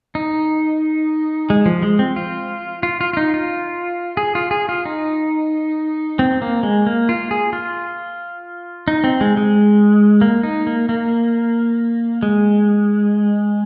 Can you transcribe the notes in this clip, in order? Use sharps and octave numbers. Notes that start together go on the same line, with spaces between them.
D#4
G#3
F3
G#3
C4
F4
F4
F4
F4
D#4
F4
G#4
F4
G#4
F4
D#4
C4
A#3
G#3
A#3
F4
G#4
F4
D#4
C4
G#3
G#3
A#3
D#4
A#3
A#3
G#3